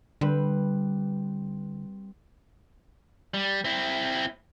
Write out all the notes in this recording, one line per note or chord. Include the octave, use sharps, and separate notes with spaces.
D3 G3 C4 B4
G3
C4 E4